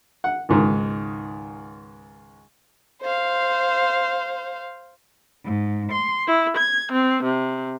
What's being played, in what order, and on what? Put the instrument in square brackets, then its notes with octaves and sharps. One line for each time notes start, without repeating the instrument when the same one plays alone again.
[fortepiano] F#5
C#2 G#2 D#3
[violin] C5 F5
[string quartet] G#2
C6
E4
G#6
C4
C3